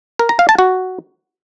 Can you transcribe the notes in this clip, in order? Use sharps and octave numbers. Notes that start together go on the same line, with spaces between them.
A#4
A#5
F5
A5
F#4